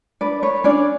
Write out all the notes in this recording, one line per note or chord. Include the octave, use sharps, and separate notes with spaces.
D4 B4 D5
B4 C#5
C#4 D4 D5